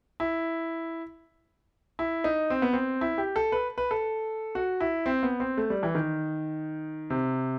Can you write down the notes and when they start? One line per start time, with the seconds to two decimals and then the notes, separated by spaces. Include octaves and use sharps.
0.20 E4
1.99 E4
2.24 D#4
2.50 C4
2.62 B3
2.73 C4
3.01 E4
3.18 G4
3.36 A4
3.52 B4
3.78 B4
3.91 A4
4.55 F#4
4.81 E4
5.06 C4
5.23 B3
5.40 C4
5.58 A3
5.70 G3
5.83 E3
5.95 D#3
7.10 C3